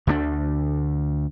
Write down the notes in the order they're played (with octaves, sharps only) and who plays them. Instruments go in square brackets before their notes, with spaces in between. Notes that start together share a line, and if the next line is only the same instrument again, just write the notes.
[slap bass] D2 D3 E3 D4